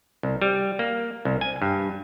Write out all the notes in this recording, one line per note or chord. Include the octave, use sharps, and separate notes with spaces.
C2
G3
A#3
C2
G#5
G2